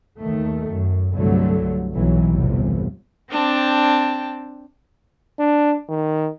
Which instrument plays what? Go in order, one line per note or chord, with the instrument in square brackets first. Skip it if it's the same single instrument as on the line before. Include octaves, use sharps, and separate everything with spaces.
[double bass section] D#2 D#3 A3
F#2
C2 G2 D3 F#3 A3
B1 E3 F#3
G1 E2 A2 C3
[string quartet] C4 D4 G5 A5
[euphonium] D4
D#3